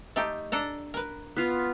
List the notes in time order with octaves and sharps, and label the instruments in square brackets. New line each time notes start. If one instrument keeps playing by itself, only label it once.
[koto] A3 D#4 G4
D4 A4 A#5
A#4 B4
[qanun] B3 F4